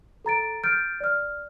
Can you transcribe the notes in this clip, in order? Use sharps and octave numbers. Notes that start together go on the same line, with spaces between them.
A4 A#5 A6 D7
F6 G6 A6 D7
D5 F6